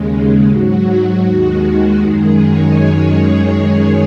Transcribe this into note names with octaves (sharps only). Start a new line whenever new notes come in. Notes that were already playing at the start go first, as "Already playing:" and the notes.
Already playing: D#2 C#3 G#3
G#2 F#3 F#4
D#2 D#3 G#3
F#2 D#3 G#3 G#4
C#5